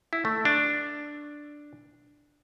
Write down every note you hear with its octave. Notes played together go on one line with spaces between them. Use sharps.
E4
A3
D4